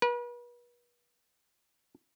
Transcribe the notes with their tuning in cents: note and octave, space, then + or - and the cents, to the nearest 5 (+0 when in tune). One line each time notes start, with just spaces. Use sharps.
B4 -40